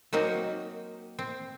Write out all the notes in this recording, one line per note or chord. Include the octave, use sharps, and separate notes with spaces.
F#3 A#3 C4 D#4 F#4
C4